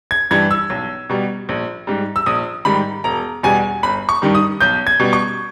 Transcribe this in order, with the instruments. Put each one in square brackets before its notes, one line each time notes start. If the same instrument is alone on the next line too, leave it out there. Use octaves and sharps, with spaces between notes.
[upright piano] G#6
G2 E3 G3 G#6
E6
B1
B2 G3
A#1
G#2 G3
E6
A#1 D#6
G#2 D#3 G3 B5
E1 A#5
E2 B2 G3 G#5
G1 B5
C#6
G2 D#3 G3
D#6
B1 G6
G#6
B2 G3
C#6